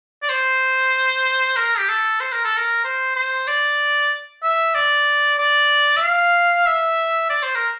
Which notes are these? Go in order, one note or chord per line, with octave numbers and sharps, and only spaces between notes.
D5
C5
A#4
G4
A4
C5
A#4
A4
A#4
C5
C5
D5
E5
D5
D5
E5
F5
E5
D5
C5
A#4